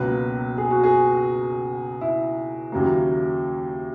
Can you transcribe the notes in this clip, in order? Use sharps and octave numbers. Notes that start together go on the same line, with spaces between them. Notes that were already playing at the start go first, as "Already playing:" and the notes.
Already playing: C#2 B2 F#3 A#3 B4
G#4
F#4
G#4
E4
D#2 C#3 F#3 A#3